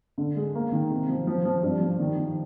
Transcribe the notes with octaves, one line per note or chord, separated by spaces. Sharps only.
D3
G#3
A#3
D#3
C3
F3
F3
F3
G2
F3
D#3
D#3